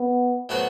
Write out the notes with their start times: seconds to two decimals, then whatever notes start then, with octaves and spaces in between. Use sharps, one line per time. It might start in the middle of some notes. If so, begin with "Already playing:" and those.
Already playing: B3
0.49 A2 F#3 B3 F#4 C5